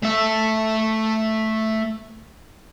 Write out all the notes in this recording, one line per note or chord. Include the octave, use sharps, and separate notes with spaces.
A3 E5